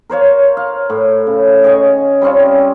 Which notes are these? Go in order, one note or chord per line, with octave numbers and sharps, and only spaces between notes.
A#4 C5 C#5 F5
F5
A2
C#3
G#4 C#5 D#5 G#5
G3 C4 C#4 F4